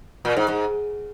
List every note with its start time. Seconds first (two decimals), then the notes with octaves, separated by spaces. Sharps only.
0.25 A#2
0.37 G#2
0.48 G#2